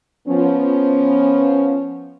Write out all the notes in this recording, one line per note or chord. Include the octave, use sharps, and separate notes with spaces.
F3 B3 C#4